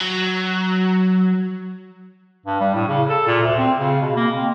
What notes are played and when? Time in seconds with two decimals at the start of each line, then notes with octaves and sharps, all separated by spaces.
0.01 F#3
2.46 G2
2.61 G3
2.74 A2
2.88 C#3
3.09 A4
3.27 A#2
3.43 D2
3.58 C4
3.77 C#3
4.01 B2
4.16 A#3
4.35 C4